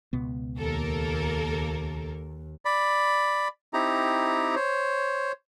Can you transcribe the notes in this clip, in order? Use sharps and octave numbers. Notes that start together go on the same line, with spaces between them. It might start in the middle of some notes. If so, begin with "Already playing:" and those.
C#2 B2 B3
D#2 A#3 A4 A#4
D5 B5
C4 D#4 E4 G4 A#5
C5 C#5